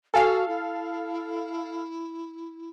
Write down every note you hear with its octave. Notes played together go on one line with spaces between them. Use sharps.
F#4 A4 F5 G#5
E4